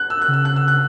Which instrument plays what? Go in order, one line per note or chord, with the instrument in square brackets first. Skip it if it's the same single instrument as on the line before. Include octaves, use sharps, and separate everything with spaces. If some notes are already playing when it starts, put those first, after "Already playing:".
Already playing: [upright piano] F#6
E6
F#6
[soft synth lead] C#3
[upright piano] E6
F#6
E6
F#6